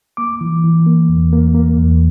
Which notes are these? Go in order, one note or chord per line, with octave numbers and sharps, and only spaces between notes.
A#3 D6
E3
E3
A#3
E2
A#3
A#3
E2